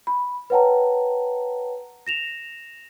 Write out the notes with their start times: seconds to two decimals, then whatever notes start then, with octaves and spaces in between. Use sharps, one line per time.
0.07 B5
0.50 B4 C#5 F#5 G5 A5 A#5
2.07 A#6 E7 F7